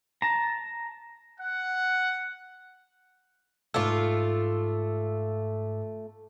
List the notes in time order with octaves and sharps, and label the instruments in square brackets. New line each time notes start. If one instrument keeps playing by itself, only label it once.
[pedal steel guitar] A5 A#5
[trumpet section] F#5
[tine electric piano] G#2 D6 E6 [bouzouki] A3 F4